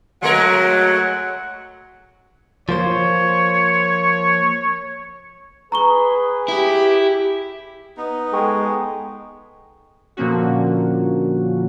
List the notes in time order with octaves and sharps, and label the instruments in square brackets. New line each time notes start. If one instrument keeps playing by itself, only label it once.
[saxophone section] F#3 [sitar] G#3 A3 A#4 [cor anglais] F#5
[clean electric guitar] F3 A#3 C5 [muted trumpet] C#5
[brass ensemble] G#4 B4 [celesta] A#5 C#6 G7
[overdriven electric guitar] E4 [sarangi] G4
[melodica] B3 D#4
[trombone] G#3 [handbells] A4 G5 C#6
[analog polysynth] A#2 D3 F3 A#3 C#4 F#4